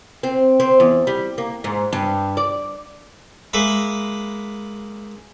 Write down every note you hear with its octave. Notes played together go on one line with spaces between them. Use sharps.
C4
C4
E2
G3
A#3
G#2
G2
D5
G#3 A#3 B4 E5